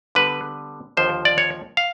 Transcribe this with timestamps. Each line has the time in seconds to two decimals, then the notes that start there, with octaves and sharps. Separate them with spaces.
0.15 D3 G3 B3 D4 B4
0.97 D#2 D3 F3 A#3 C5
1.25 D5
1.38 C#5
1.77 F5